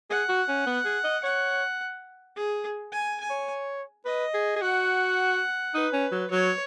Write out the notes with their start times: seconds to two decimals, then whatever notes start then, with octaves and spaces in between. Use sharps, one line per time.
0.10 G#4 F#5
0.29 F#4
0.48 C#4
0.66 B3
0.85 G#4
1.04 D#5
1.23 C#5 F#5
2.36 G#4
2.92 G#5
3.20 G#5
3.30 C#5
4.05 B4 D#5
4.34 G#4
4.56 G#4
4.62 F#4 F#5
5.74 D#4 B4
5.93 C#4
6.12 F#3
6.31 F#3 C#5